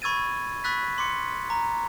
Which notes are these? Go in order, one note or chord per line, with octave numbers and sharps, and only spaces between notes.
B5 C#6 E6 G#6 A6 D#7
B5 C#6 E6 F#6 A6 B6
C6 D6 C#7
A#5